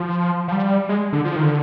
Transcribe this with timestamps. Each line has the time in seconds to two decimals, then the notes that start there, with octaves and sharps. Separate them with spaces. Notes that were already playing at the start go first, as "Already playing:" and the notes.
Already playing: F3
0.48 F3
0.52 G3
0.89 G#3
1.13 D3
1.25 F3
1.36 D#3
1.43 D3